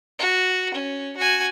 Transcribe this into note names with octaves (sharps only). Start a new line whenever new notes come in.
F#4
C#4
F#4 G#5